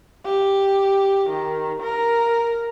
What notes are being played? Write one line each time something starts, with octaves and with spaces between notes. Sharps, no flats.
G4
D#3
A#4